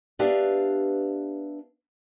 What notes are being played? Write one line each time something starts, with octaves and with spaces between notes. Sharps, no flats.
B3 D4 G4 B4 E5 F5